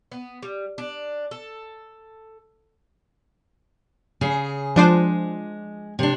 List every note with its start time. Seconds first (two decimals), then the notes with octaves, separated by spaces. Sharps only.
0.12 B3
0.42 G3
0.78 D4
1.31 A4
4.21 C#3 G#4
4.76 F3 G#3 D4 C5
5.99 C3 D4